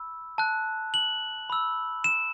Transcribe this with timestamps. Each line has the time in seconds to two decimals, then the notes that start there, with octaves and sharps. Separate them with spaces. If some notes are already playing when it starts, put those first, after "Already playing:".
Already playing: B5 E6
0.38 A5 F#6
0.94 F#7
1.50 B5 E6
2.04 E7